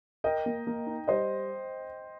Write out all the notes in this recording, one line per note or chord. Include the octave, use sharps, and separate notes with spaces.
A#4 D#5 G5
A#3
A#3
D#4
G3 C5 D#5